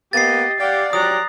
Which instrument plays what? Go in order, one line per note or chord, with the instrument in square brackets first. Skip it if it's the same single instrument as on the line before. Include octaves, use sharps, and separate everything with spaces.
[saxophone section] A#3 B3 [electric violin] G4 D#5 [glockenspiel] A6 C7
[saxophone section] G4 [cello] D5 [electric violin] F5 F#5
[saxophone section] F3 F#3 G4 [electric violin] A#5 F#6 [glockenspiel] D#6